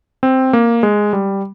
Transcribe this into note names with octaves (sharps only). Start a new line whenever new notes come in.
C4
A#3
G#3
G3